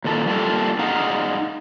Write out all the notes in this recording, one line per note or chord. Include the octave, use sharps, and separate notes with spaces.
A#2 D#3 A4 C5 A5
G3 A#3 D4 F4 A4
D#4 G#4 F5 F#5 A#5